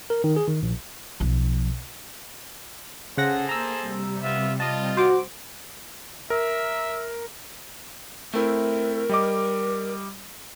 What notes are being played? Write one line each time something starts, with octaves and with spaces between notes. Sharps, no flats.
A#4
D#3
G#4
D#3
A#1
B1 F3
C#3 G#4 A4 C5 F#5 A#6
A#3 A#5 E6
C3 G3
B3 F4 E5
F4 D#5 A5
F#4 C5 D6
A#4 E5
A3 C4 E4 A#4
G3 D#5 D6